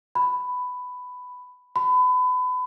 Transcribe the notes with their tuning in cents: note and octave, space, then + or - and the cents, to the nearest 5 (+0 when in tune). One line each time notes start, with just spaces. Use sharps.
B5 +10
B5 +30